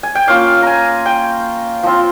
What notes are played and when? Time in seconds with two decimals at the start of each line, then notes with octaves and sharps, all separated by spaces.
0.03 G#5
0.15 G5
0.27 A#3 C#4 F4 F5
0.62 G#5 A#5
1.06 G5
1.83 F3 C4 F4